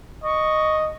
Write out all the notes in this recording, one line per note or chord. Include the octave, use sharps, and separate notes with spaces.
D#5 C#6